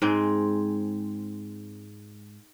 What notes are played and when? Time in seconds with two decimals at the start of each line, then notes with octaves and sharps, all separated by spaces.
0.02 G#2 G#3 C4